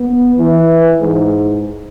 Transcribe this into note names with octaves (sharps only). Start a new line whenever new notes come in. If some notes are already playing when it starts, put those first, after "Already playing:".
Already playing: B3
E3
G#2